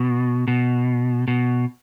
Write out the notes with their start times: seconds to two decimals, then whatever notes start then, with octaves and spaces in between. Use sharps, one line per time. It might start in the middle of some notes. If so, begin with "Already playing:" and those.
Already playing: B2
0.48 B2
1.28 B2